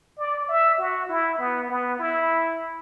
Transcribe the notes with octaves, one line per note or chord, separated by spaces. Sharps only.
D5
E5
F#4
E4
B3
B3
E4